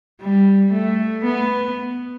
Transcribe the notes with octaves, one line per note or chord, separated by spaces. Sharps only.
G3
A3
B3